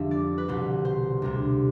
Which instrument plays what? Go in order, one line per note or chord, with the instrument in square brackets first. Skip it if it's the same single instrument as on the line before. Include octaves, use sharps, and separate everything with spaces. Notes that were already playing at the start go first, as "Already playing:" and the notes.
Already playing: [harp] F2 D3 G3 C5 E5
D5
B4
C2 B2 G3 C5
C5
D2 C3 G3